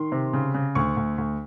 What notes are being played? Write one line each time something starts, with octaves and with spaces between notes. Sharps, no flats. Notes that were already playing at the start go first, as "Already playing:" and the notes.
Already playing: D#3 C6
C3
C#3
C#3
D2 C#6
D2
D2